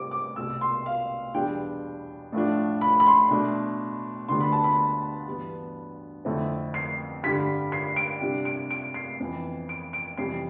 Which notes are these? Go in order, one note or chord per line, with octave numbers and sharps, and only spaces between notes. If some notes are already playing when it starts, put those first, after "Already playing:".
Already playing: C3 G3 C4 D6
D6
C2 B2 A3 E6
C6
F5
E2 B2 G3 B3 D4 G5
A2 F3 A3 D4
B5
B5
C6
B2 A3 D4
D2 D3 G3 B3 D4 C6
B5
A5
B5
G2 E3 B3
F2 D3 A3 C4 E4
C7
G2 D3 G3 B6
C7
D7
C3 G3 D4
D7
D7
C7
F2 E3 B3
D7
D7
F2 C3 E3 G3 C7